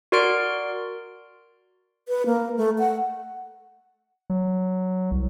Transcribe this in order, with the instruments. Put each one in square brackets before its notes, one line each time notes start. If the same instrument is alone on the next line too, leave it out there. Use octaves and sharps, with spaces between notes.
[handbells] F#4 A#4 D5 C6 F6 D7
[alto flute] B4
A#3
A3
F#5
[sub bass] F#3
C2